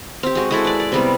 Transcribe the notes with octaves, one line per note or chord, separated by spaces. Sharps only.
C4 G4
G#3 F#4
G#3 E4 A4
B4 D5
D5
C3 G3 B3